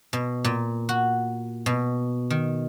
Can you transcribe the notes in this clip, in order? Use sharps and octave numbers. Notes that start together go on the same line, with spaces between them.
B2
A#2
F#4
B2
D#3